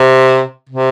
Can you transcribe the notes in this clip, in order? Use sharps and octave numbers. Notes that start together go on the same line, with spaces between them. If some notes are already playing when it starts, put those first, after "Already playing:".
Already playing: C3
C3